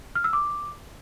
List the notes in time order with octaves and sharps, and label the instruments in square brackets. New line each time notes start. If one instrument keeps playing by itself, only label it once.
[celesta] F6
E6
D6